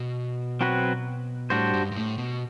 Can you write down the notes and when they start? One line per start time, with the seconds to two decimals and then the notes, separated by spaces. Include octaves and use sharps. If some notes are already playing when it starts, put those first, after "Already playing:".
Already playing: B2
0.61 F#3 C4 F#4 B4
1.50 A2 G3 D4 F#4 C5
1.74 G2
1.92 G2
1.97 A2
2.18 B2